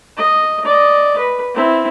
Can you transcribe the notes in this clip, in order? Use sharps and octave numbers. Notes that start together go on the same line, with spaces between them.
D#5
D5 D#5
B4
C4 E4